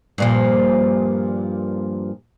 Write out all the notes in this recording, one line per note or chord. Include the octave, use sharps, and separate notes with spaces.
G2 A#2 F3